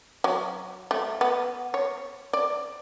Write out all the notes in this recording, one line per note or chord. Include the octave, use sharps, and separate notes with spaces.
F#3
A3
B3
C#5
D5